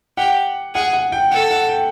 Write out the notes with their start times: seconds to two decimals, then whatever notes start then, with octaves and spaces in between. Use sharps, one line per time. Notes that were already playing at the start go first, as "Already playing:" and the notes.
0.17 G4 F#5
0.75 G#4 F#5
0.93 F#5
1.12 G5
1.31 A4 F#5
1.51 F#5
1.69 G5